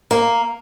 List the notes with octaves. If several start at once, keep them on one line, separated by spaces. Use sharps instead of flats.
A#3